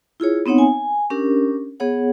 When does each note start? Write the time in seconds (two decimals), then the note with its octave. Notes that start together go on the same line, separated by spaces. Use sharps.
0.20 E4 F4 G#4 C#5
0.46 B3 C4 D#4 C#5 F#5
0.58 G#5
1.10 C#4 D4 G4 A#4
1.80 B3 G#4 C#5 F#5